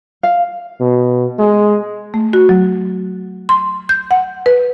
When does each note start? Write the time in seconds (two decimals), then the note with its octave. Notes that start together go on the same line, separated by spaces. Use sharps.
0.23 F5
0.81 B2
1.39 G#3
2.14 A3
2.33 F#4
2.49 F#3
3.49 C6
3.89 G6
4.11 F#5
4.46 B4